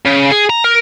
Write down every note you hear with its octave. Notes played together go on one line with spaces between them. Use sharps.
C#3
G#4
A#5
A#4